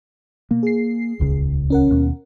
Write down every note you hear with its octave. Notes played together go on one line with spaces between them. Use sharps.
B2 A#3
G#4 C7
D#1 C#2 C#3
C#4 A#4 F#5
D#2 B2